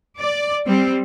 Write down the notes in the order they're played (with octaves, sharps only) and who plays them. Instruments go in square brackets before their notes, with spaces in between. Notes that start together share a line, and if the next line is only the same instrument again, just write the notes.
[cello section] D5
G3 C4